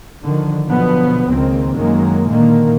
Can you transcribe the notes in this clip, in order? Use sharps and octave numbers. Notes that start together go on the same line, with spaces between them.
D3 D#3 F3
B2 D3 F3 F#3 B3
C#2 D#3 A#3 C4
F#2 D#3 F#3 G#3 A#3
A#2 D3 D#3 A#3